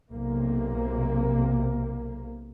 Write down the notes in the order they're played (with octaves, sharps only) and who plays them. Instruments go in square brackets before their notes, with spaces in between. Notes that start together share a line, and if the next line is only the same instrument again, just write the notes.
[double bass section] B1 C3 A#3